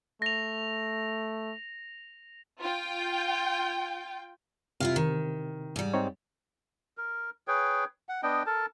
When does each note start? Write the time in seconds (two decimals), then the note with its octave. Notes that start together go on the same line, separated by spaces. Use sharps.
0.22 A3 A#6 F7
2.62 F4 G5
4.80 C3 E4 F4 F5
4.96 D#3
5.76 G#2 G3
5.94 C4 D#4 C#5
6.97 A#4
7.48 G#4 B4 C#5 G5
8.09 F#5
8.23 B3 D4 D#5 G5
8.46 A4 A#4 A5